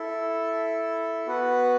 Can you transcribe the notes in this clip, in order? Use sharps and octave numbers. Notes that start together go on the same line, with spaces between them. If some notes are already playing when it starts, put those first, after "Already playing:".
Already playing: E4 A4 E5
B3 F#4 B4 F#5